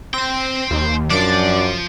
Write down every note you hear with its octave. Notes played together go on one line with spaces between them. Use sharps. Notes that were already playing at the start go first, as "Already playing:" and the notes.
C4 C5 G5 A#6
D#2
F#2 F3 D4 D5 D6